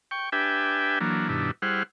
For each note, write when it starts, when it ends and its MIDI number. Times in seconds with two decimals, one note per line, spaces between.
0.11 0.30 79
0.11 0.30 85
0.32 0.99 62
0.32 0.99 67
0.32 0.99 71
0.32 0.99 76
0.32 0.99 79
0.32 0.99 80
1.01 1.28 52
1.01 1.28 54
1.01 1.28 58
1.01 1.28 62
1.29 1.51 43
1.29 1.51 47
1.29 1.51 51
1.29 1.51 62
1.29 1.51 64
1.62 1.83 55
1.62 1.83 64
1.62 1.83 68
1.62 1.83 72
1.62 1.83 78
1.62 1.83 89